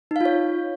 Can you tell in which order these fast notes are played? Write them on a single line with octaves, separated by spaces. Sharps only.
D#4 F5 F4 C#5